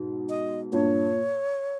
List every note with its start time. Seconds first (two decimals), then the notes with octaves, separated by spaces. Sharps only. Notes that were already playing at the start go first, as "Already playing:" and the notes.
Already playing: G#2 B2
0.29 D#5
0.72 G2 A#2 C#5